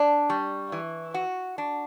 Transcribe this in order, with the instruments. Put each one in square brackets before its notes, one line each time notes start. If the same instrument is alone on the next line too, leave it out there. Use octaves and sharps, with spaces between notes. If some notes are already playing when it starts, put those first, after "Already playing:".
Already playing: [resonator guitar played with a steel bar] D4 [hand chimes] D5
[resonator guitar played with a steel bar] G3 [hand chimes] C#6
[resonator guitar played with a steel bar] E3
F#4
D4